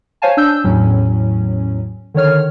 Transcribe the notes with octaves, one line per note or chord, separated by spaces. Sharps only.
C5 C#5 F5 G#5 A5
D4 E6 G6
E2 A2 F#3 C#4
D3 D#3 C#5 F6